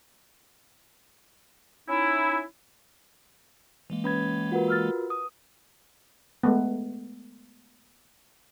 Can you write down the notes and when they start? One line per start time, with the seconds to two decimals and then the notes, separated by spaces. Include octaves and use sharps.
1.88 C#4 D#4 E4
3.90 E3 G#3 A#3
4.04 C#4 B4 B5 G#6
4.52 F4 F#4 A#4 B4 F#5
4.68 E6 F6 A6
5.10 D#6
6.43 G#3 A3 B3